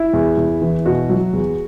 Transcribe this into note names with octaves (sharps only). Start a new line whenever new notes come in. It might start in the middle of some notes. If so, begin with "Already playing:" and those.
Already playing: E4
E2
E2
E3
B2 F#4
F#3
E2